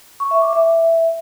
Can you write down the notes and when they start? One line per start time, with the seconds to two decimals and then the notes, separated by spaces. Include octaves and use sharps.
0.20 C#6
0.31 E5
0.42 D6
0.53 E5